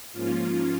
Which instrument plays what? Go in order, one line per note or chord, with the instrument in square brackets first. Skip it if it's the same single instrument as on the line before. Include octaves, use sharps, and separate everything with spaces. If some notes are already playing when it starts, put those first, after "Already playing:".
[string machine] G#2 F3 A#3 C#4 F4